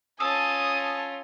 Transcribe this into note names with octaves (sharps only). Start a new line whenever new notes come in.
C#4 F4 A4 G#5 A5 D#6